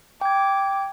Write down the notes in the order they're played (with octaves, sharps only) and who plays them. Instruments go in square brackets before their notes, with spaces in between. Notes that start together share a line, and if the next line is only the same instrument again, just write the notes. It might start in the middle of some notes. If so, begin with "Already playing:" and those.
[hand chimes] G5 G#6 [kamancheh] D6